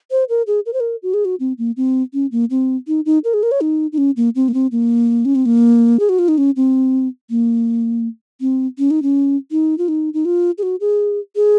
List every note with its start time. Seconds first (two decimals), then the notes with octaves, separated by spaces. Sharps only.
0.11 C5
0.29 A#4
0.47 G#4
0.66 A#4
0.73 C5
0.80 A#4
1.03 F#4
1.14 G#4
1.25 F#4
1.40 C4
1.58 A#3
1.77 C4
2.14 C#4
2.32 A#3
2.50 C4
2.88 D#4
3.06 D#4
3.24 A#4
3.34 G#4
3.43 A#4
3.51 C#5
3.61 D#4
3.92 D#4
3.98 C#4
4.17 A#3
4.35 C4
4.48 A#3
4.54 C4
4.72 A#3
5.25 C#4
5.35 C4
5.46 A#3
6.00 G#4
6.09 F#4
6.19 F4
6.28 D#4
6.38 C#4
6.56 C4
7.30 A#3
8.41 C4
8.78 C#4
8.91 D#4
9.02 C#4
9.51 D#4
9.78 F4
9.88 D#4
10.14 D#4
10.25 F4
10.58 G#4
10.63 F#4
10.80 G#4
11.36 G#4